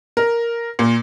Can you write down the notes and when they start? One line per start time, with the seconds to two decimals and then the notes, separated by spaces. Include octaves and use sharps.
0.17 A#4
0.79 A#2